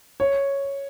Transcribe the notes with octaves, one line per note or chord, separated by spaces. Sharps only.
C#5